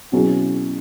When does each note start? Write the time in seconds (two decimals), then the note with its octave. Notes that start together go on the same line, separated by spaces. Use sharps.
0.12 B2 F#3 C#4 E4 G#4